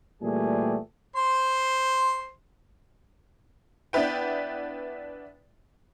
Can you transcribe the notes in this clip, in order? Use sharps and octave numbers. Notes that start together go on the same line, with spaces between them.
A#2 E3 G3 A3 G4 G#4
C5 C6
B3 D4 E4 B4 G5